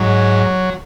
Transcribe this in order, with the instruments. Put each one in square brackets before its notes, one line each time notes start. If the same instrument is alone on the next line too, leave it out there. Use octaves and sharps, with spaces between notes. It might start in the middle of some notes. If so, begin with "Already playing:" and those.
Already playing: [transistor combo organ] G#2 F#3